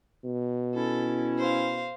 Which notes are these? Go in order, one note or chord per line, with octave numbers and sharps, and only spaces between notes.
B2
C#4 E4 A4
C5 F5